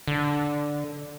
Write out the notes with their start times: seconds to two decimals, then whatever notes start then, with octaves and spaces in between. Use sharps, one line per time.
0.08 D3